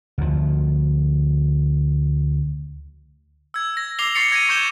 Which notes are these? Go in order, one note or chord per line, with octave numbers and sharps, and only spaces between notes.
D2 F3
E6 G#6
A#6
D6 E6 A#6 C7 F7 G7
C#6 A6 C7 C#7 F7
C#6 G#6 A#6 C7 C#7 D#7
C#6 D6 G6 C#7 E7 G7